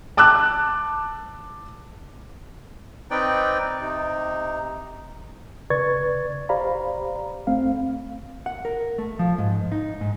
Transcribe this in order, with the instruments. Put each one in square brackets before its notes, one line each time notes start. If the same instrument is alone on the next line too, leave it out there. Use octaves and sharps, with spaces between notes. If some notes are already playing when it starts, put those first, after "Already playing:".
[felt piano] A5 D6 E6 F#6
[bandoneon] C4 D#4 B4 D5 G5
C3 D#4
[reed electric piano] C#3 B4 D5 C#6 G#6 A6
G4 C5 D5 F5 A#5 B5
D2 A3 C4 F5
[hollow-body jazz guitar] F#5
A#4
A3
F3
G#2
D#4
G#2